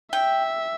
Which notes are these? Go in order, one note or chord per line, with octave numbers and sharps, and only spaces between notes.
E5 G5